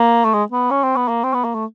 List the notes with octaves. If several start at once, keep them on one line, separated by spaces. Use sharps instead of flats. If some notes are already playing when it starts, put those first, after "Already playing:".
Already playing: A#3
A3
G#3
B3
C#4
C4
B3
A#3
C4
B3
A#3
A3